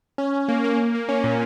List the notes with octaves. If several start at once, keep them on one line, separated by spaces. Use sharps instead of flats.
C#4
C#4
A#3
A#3
A#3
A#3
C#4
A#2